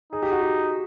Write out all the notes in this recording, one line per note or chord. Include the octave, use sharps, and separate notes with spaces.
D#4 G#4
G4
F#4
G4